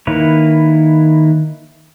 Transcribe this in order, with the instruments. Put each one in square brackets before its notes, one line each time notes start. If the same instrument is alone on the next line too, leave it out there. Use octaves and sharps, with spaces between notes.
[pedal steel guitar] D#3 A#3 E4 B4 C#5